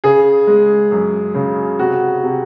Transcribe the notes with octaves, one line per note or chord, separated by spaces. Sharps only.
C#3 G#4
G#3
F#2
C#3
C3 F#4
C3